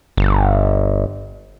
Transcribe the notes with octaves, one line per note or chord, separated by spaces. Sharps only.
G1